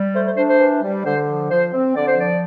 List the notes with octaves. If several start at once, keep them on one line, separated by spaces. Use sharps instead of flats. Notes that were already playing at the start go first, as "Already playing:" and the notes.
Already playing: G3
A3 C5
C5
D4 C5
C5
E3
G3
D3 C5
F3
F3 C5
C4
D3 D5
C5
F3 D5